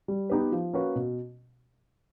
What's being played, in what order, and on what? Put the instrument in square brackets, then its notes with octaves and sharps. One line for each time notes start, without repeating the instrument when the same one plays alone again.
[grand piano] G3
B3 D#4 G4 B4
F3
A#3 C#4 F#4 B4
B2